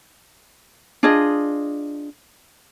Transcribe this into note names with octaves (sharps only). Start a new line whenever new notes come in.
D4 F4 G#4 D#5